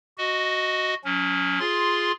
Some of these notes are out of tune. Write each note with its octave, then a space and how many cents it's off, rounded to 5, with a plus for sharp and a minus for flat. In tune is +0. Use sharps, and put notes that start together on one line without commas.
F#4 +0 D#5 +0
F#3 -30 C#4 +15
F4 +5 G#4 +5 C6 +0